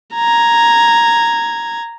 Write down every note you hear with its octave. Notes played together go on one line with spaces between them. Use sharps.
A#5 G#6